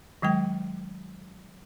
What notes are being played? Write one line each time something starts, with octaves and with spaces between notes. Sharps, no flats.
D#3 F#3 G#3 G5